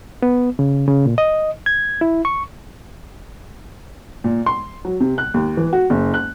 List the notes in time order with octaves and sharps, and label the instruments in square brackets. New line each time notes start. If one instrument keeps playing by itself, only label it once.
[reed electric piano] B3
C#3
C#3
A#2
D#5
G#6
E4
C#6
[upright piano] A#2
C6
F#3
C3
F#6
D#2
E3
F#4
F#1
F#6